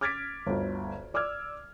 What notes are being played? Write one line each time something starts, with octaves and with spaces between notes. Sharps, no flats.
D6 F6 G#6 A6 B6 D7
G1 D2
D5 D6 E6 F6 G#6